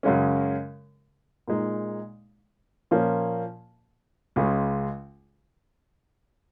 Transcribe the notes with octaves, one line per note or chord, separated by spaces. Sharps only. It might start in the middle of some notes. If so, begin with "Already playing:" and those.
F#2 C#3 G#3 C#4
A#2 G#3 D#4
A#2 F3 A#3 C#4
C#2 C#3 G#3